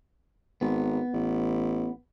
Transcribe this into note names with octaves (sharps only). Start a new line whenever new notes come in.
G#1 B3
A1